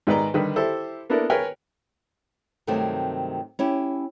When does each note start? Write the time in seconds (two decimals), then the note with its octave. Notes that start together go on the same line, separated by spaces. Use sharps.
0.07 G#2 D#3 B4 D5 D#5 A#5
0.34 D3 D#3 G3 B4
0.56 E4 G4 A4 C5 E5
1.10 A#3 B3 D4 E4 A4 A#4
1.30 A#4 B4 C#5 G5 G#5
2.67 G2 C3 D#3 F#3 A3 C4
3.59 C#4 E4 G4